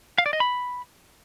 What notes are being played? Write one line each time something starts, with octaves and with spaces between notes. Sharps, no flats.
F5
D5
D#5
B5